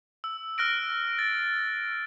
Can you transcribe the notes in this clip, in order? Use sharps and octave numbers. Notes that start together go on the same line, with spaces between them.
E6
F6 F#6 A#6 D7
A6